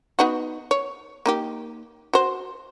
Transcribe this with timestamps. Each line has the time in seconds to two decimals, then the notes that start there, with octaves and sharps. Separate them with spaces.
0.19 B3 D#4 F#4
0.71 C#5
1.26 A#3 D#4 G4
2.13 F#4 C5